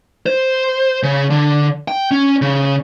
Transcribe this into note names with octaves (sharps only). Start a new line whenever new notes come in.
C5
C#3
D3
G5
C#4
C#3